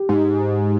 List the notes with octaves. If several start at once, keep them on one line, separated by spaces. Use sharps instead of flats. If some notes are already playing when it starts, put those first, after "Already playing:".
Already playing: G4
G#2